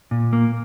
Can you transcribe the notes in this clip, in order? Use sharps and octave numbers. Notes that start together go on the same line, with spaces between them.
A#2
A#3